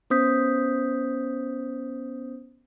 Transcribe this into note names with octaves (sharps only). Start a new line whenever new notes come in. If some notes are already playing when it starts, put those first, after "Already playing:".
B3 C#4 C5 D#6 G6 B6